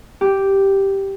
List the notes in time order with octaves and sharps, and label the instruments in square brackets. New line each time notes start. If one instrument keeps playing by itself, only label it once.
[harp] G4